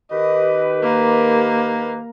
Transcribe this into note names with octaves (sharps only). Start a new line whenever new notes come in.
D#3 G4 B4 D#5
A#3